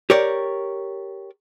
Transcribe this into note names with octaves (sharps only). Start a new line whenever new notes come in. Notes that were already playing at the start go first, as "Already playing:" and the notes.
G4 A#4 C#5 D5